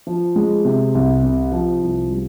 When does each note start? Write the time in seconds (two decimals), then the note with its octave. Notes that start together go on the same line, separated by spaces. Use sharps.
0.07 F3
0.36 G#3
0.65 C3
0.95 C2
1.23 C3
1.52 F3
1.82 C2
2.10 G3